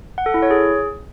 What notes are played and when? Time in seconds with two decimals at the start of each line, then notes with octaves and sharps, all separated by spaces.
0.18 F#5
0.26 A4
0.34 E4
0.42 C#5
0.51 G#4